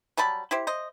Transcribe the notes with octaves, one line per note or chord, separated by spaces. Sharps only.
F#3 G3 A5 B5
E4 G4 C5
C5 D#5